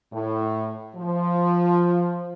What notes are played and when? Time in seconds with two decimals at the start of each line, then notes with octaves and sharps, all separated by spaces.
0.12 A2
0.96 F3